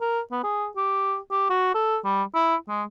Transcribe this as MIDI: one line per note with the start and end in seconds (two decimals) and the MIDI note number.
0.01 0.20 70
0.32 0.40 59
0.43 0.67 68
0.77 1.17 67
1.31 1.48 67
1.50 1.74 66
1.75 1.98 69
2.04 2.23 55
2.35 2.55 64
2.68 2.83 56